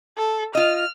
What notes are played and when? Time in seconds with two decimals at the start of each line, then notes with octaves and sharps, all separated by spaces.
0.17 A4
0.55 F4 D#5 F6